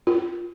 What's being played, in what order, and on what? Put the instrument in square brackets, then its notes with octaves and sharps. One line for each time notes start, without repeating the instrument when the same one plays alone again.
[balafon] F4